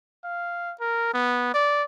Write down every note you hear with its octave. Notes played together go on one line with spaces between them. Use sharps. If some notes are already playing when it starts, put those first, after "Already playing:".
F5
A#4
B3
D5